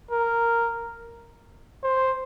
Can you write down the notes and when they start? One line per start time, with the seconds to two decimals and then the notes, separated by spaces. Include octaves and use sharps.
0.11 A#4
1.83 C5